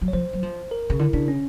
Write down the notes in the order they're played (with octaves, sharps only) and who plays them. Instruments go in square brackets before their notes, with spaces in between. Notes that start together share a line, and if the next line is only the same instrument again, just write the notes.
[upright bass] F#3
[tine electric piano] C#5
[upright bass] F3 [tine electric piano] C5
[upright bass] F#3
F3
[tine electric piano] A#4
[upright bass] C#3
[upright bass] D3 [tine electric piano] E4
[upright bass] C#3 [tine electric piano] D4
[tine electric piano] C#4